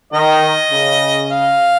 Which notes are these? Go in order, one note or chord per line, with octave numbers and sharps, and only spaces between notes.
D#3 D#5
C#3
F5